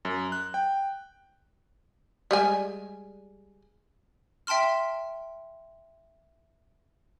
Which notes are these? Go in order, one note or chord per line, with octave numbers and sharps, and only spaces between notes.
F#2
F#6
G5
G3 G#3 G#5
E5 G5 A5 C6 F6